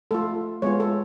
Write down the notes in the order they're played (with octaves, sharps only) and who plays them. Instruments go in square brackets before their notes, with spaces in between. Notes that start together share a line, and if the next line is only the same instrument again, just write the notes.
[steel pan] A3 F4 A4
G#3 B3 F4 C#5
A4